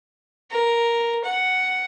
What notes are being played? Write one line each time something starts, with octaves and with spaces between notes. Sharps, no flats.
A#4
F#5